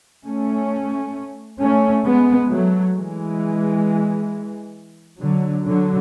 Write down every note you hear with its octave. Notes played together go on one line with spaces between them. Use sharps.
A3 C#4
A3 C#4
G#3 B3
F#3 A3
E3 G#3
D3 F#3
D3 F#3